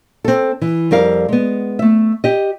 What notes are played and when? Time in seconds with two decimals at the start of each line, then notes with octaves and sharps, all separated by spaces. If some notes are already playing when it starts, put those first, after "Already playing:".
0.24 C4 A4
0.61 E3
0.91 F2 G3 A#4 F5
1.29 G#3 B3
1.79 A3 E5
2.24 G4 D#5